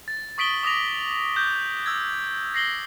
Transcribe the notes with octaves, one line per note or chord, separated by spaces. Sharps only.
A6
C#6 D#6 B6 D7 F#7 G7
D6 D#6 A#6 F7
D6 F#6 G6
E6 G#6
A#6 C7 F#7 G7